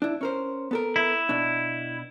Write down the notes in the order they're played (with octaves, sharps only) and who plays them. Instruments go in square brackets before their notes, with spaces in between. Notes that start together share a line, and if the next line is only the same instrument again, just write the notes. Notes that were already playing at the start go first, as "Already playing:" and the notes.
[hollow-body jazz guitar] D4 E4
C#4 A#4 C5
B3 A4 A#4
[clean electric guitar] E4
[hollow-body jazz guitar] B2 D4